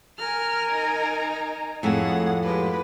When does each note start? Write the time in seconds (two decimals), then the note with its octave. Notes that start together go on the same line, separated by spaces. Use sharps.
0.19 A#4 G#5 F6
0.71 D#4 A#5
1.83 F2 A2 G#4 F#5
2.43 G#3 G4 B4